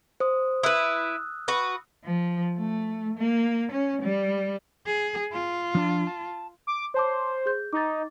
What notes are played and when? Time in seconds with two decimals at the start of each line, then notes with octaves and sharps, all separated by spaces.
0.20 C5 D#6
0.63 E4 B4 D#6 E6 F#6
1.48 F#4 B4
2.05 F3
2.57 A3
3.18 A#3
3.72 C#4
4.02 G3
4.87 G#4
5.33 F4
5.75 F3 D4 A5
6.07 A5
6.67 D6
6.94 C5 C#5 A5 D6
7.46 G#4 G6
7.73 D#4 D6 A6